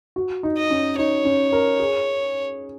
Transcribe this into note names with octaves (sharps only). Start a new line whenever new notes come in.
F#4
D#4
D#5
C#4
D#4 C#5
C#4
A#4
G#4